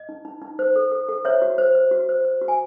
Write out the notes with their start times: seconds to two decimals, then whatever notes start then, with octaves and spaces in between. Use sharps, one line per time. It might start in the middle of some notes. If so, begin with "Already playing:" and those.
Already playing: D#5
0.09 D#4
0.25 D#4
0.42 D#4
0.59 C5
0.76 A4
0.92 A4
1.09 A4
1.25 C5 C#5 E5
1.42 F#4
1.58 C5
1.75 C5
1.91 F#4
2.09 C5
2.25 C5
2.41 F#4
2.48 G#5